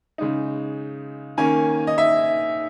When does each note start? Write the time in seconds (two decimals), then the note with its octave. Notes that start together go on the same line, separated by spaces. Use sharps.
0.18 C#3 G#3 D#4
1.37 D#3 A#3 C#4 G#5
1.87 D#5
1.98 E5